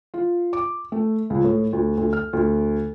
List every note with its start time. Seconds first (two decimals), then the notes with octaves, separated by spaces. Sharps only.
0.14 F4
0.53 D6
0.92 A3
1.30 C#2
1.44 A2
1.73 D2
1.97 D2
2.13 F6
2.33 D2